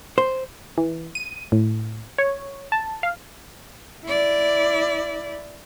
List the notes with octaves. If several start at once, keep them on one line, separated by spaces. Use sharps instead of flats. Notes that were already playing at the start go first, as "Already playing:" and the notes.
C5
E3
D#7
A2
C#5
A5
F5
E4 D5